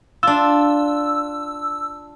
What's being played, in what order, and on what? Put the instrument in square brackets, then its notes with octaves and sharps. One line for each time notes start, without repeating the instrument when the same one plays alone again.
[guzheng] D4 F4 [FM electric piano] E6